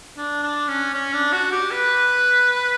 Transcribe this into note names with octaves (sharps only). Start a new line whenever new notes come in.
D4
D4
C#4
C#4
D4
F#4
G4
B4